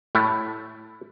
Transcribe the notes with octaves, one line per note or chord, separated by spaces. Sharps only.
A2 A3 E4